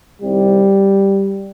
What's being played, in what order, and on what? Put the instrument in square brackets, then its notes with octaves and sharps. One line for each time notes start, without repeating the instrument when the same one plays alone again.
[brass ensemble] C2 C3 D#3 G3